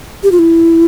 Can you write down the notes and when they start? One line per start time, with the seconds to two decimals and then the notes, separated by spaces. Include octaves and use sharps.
0.23 G4
0.32 F4
0.39 E4